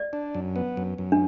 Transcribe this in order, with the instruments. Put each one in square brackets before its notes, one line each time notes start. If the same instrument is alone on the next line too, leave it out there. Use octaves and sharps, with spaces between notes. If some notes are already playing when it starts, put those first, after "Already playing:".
Already playing: [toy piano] D5
[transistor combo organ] D4
F#2
B3
F#2
F#2
[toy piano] D4